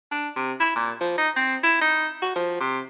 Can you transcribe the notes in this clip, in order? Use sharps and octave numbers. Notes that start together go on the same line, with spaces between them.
D4
C3
E4
A#2
F3
D#4
C4
E4
D#4
F#4
F3
C3